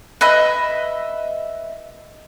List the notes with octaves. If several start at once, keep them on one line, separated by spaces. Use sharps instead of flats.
B4 D#5 E5 B5